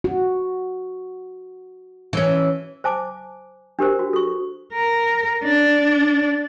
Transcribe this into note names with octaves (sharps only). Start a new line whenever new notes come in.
F#4
E3 C#4
C5 G#5 A5 D6
D4 G4 A#4 C5
F#4
A4 C#6
A#4
D4